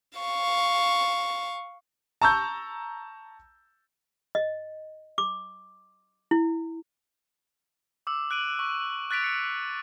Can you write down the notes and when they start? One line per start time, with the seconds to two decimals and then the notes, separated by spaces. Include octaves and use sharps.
0.18 F5 C#6
2.21 A5 A#5 C#6 E6 G6
4.35 D#5
5.18 D6
6.31 E4
8.07 D6 E6
8.31 F#6 D7 D#7 F#7
8.59 C#6
9.11 F#6 A6 B6 D7 F7
9.24 F#6 C#7